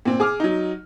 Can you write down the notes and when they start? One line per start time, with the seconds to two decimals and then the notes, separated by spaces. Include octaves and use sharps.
0.05 A#2 C4
0.20 G#4 D6 F6
0.40 F#3 D#4